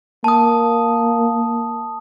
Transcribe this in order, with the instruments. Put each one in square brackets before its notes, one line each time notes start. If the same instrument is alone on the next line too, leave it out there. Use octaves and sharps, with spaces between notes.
[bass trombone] A#3 [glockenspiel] A5 D#6